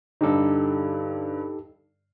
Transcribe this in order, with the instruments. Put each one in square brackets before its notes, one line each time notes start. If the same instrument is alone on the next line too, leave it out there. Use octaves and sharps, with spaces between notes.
[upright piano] G2 D3 [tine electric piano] D#4 G4 A4